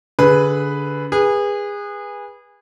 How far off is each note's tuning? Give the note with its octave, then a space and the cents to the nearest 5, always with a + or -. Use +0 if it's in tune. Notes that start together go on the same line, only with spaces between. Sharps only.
D3 -20 G#4 +0 B4 +0
G#4 -25 B4 -20